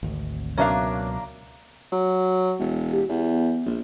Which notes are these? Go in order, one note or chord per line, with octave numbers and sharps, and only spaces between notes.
G#1 D2
C#2 B2 F#3 A#3 C#4 D4 E5 F5
F#3
E1
G4
E2 B3
A#1